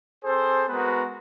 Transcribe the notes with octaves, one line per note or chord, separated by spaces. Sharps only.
C4 G#4 A4 C5
G#3 B3 F#4 A#4 B4